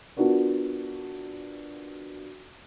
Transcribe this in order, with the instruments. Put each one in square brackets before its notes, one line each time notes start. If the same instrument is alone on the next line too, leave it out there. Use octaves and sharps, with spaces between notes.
[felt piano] B3 D4 F4 F#4 A#4